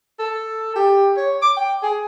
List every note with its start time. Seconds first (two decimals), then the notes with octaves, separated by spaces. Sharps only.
0.19 A4
0.75 G4
1.17 C#5
1.42 D6
1.57 G5
1.83 G#4